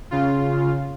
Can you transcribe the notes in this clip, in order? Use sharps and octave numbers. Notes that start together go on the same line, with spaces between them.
C#3 F4